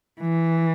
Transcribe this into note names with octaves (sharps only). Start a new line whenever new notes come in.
E3